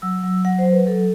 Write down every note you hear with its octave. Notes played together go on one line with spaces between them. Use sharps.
F#3 E6
F#3
F#3 F#5
C5
F#3
B4
F#3 A4